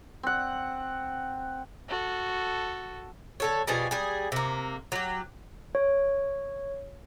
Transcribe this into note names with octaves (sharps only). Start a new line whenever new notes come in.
C4 F#5
F#4 A4
D3 A4 C#5
B2 F3 G3 G#4
G3 G#4
C3 A#3
F#3 G4
C#5